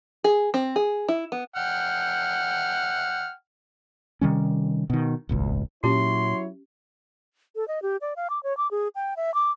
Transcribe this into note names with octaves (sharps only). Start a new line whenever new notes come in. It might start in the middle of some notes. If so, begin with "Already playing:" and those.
G#4
C4
G#4
E4
B3
F#5 G5 F6
C3 D#3 G3 C#4
B2 D#3
D#1 G#1 C#2
A#2 F#3 C#4 E4 G4 C#5 C6
A4
D#5
G4
D5
F5
D6
C#5
D6
G#4
G5
E5
D6